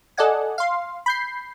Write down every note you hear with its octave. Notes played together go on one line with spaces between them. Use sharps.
A4 D5 D#5 F#5 G#5
F5 C6
B5 G6 C7